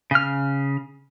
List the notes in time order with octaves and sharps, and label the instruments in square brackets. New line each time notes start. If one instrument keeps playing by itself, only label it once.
[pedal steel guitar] C#3 F6